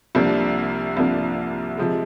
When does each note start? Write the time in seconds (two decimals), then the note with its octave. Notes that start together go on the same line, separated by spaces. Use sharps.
0.15 C2 C3 F3 A#3 D4
0.97 C2 C3 F3 A#3 D4
1.77 C3 F3 G#3